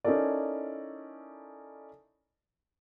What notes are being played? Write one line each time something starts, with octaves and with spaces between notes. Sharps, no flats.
C#4 D#4 E4 A4 A#4 D5